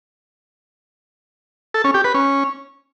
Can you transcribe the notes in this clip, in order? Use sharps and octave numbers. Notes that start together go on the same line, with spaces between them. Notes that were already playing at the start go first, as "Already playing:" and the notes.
A4
C#4
G4
B4
C#4